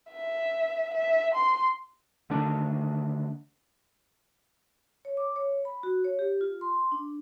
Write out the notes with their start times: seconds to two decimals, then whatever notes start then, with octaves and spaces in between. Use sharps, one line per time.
0.10 E5
0.94 E5
1.35 C6
2.30 D3 D#3 A3 D4
5.05 C#5
5.17 D6
5.36 C#5
5.65 B5
5.83 F#4
6.05 C#5
6.19 G4
6.41 F4
6.61 C6
6.92 D4